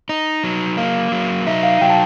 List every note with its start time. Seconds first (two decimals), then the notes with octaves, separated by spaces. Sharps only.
0.09 D#4 D#5
0.44 F#3
0.77 A#3 F5
1.12 F#3
1.47 D#4 E5
1.63 F5
1.81 F#3 G5
1.90 A5